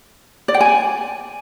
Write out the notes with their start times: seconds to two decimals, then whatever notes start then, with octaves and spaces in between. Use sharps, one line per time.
0.48 D5
0.54 G5
0.60 G#5